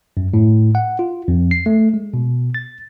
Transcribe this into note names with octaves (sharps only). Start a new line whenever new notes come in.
F#2
A2
F#5
F4
F2
C7
A3
G#3
B2
A6